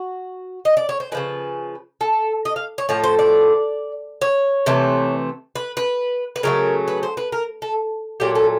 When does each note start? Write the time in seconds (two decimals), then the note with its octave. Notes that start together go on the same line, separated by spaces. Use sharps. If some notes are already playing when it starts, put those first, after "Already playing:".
Already playing: F#4
0.65 D#5
0.77 D5
0.89 C#5
1.00 C5
1.12 C#3 F3 G#3 B4
2.01 A4
2.45 D#5
2.56 F5
2.78 C#5
2.89 A2 F3 A3 C#5
3.04 C5
3.19 D5
4.21 C#5
4.66 C3 E3 A3
5.56 B4
5.77 B4
6.36 B4
6.43 C#3 F#3 A3 A#4
6.88 B4
7.03 C5
7.17 B4
7.32 A#4
7.62 A4
8.20 A#2 F#3 A3 G4
8.35 A4